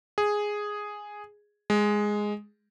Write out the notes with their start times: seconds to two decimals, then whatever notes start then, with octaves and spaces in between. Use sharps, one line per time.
0.18 G#4
1.70 G#3